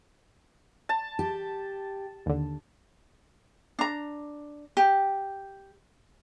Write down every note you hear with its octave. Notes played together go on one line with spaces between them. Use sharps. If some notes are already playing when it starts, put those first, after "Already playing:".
A5
G4
D#2 D3
D4 A#5
G4